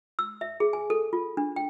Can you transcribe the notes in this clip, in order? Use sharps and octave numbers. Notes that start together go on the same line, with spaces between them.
E6
E5
G#4
G#5
A4
F4
D4
G5